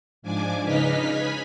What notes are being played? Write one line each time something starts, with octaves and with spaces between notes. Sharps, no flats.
G#2 F3 D4 G#5 D6
C#3 D#4 B4 D#5 F6 B6
G#5 B5